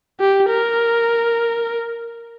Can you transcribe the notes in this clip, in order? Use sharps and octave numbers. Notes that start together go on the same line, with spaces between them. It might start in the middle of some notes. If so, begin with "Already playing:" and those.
G4
A#4